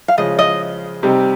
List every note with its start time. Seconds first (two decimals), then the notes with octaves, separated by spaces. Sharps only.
0.08 F5
0.18 C#3 F3 G#3 D#5
0.39 D#5
1.03 C3 G3 C4 D#4